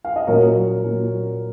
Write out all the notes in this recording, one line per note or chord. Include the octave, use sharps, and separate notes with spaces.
F5
D#5
A#2 F#3 C#4 A#4 C#5
A#2 F#3 C#4